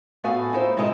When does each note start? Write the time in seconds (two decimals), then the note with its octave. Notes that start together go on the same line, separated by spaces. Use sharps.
0.24 A2 B3 F#4 B4 F5 G#5
0.53 D#4 E4 C5
0.77 G#2 C3 D#4 E4 D#5 A#5